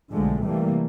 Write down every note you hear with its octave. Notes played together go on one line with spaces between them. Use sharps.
B1 D3 F3 G#3 A3
C3 E3 G3 A3 A#3